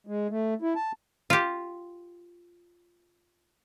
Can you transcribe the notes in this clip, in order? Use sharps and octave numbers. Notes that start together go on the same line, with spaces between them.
G#3
A3
E4
A5
F4 G4